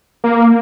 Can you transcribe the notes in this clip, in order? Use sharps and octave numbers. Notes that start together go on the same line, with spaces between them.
A#3